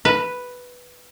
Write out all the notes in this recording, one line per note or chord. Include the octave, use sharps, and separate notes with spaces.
B4